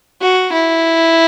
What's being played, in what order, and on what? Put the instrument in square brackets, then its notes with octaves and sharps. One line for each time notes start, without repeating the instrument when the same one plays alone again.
[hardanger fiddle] F#4
E4